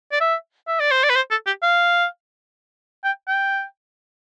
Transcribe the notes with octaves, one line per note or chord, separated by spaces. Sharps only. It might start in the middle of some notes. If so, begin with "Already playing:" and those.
D5
E5
E5
D5
C5
D5
B4
C5
A4
G4
F5
G5
G5